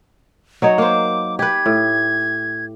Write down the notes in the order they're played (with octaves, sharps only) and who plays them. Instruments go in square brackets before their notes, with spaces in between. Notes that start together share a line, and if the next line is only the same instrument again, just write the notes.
[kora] F#3 D#4 C#5
[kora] A#3 C5 [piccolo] D6
[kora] G4 B4 [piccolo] G#6
[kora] A2